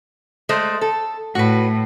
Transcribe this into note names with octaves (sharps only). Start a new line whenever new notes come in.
G#3 A3 C5
A4
A2 F#4 B4